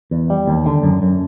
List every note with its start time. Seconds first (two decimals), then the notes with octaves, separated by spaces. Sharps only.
0.11 E2
0.30 G3
0.47 D#2
0.66 D3
0.83 F#2
1.02 F#2